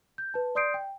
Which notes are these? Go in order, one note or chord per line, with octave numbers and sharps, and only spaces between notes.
G6
B4 A5
D5 C6 D#6 G6 C7 D7
G5